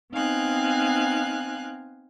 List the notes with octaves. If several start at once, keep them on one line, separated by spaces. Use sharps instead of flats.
B3 C4 D#4 F5 G#5 F#6